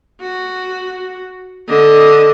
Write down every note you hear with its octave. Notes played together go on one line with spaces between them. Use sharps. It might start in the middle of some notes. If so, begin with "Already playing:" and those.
F#4
D3 D#5